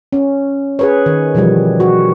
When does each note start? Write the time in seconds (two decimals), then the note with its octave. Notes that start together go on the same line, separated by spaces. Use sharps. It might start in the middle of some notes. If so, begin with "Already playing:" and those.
0.13 C#4
0.79 G#4 B4 C#5
1.06 D#3
1.35 B2 E3 F3 G3
1.80 F#4